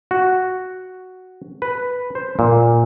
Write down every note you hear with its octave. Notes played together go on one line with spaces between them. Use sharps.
F#4
B4
C5
A#2